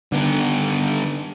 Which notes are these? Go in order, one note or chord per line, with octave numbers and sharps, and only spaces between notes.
G2 D3 D#3 B3